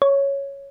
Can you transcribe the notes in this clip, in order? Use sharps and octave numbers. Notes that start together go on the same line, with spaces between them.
C#5